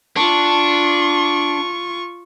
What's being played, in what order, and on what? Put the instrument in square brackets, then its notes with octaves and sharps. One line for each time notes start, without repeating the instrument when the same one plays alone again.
[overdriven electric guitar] D4 [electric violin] F4 C#6